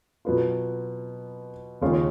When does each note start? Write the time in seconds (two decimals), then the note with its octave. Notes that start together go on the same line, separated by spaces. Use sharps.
0.25 B2 F#3 B3 F4
1.81 D#2 C#3 G#3 C#4 F4